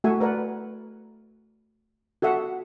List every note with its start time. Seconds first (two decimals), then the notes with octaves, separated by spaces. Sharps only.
0.04 A3 F#4 E5 F#5 G#5
0.20 A#4 B4 D5 F#5
2.22 F#4 A4 E5 F#5